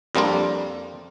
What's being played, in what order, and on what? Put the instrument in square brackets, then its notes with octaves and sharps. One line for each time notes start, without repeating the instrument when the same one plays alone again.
[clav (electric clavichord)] F2 G3 A#3 D4 F4